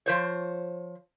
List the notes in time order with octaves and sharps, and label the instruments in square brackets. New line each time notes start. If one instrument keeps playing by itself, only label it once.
[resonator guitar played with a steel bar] F3 C5 C#5